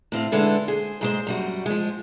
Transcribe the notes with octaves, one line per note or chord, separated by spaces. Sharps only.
A2 C4 F5
D3 G#3 E4 A4 B4
G#4 C5
G#2 G#3 C5
F#2 G3 F#4
F3 G#3